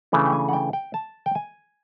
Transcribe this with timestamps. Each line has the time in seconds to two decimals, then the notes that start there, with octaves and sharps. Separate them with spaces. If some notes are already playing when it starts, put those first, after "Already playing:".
0.12 C#3 E3 A3 D4
0.27 G5
0.33 G#5
0.49 F#5
0.53 G5
0.73 G5
0.94 A5
1.26 G5
1.35 G#5